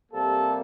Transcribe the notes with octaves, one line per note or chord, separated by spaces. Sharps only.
C3 G3 A#3 A4